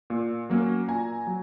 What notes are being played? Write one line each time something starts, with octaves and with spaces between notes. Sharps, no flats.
A#2
F#3 A#3 C#4
A#2 G#5 A#5
F#3